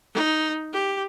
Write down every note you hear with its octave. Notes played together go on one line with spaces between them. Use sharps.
D#4
G4